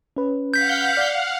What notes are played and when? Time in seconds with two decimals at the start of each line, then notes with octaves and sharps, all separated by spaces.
0.16 C#4 B4
0.54 F5 F#5 G6 B6
0.97 D5